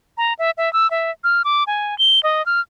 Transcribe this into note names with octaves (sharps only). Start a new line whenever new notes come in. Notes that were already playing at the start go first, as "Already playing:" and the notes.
A#5
E5
E5
E6
E5
F6
D6
G#5
G7
D#5
F6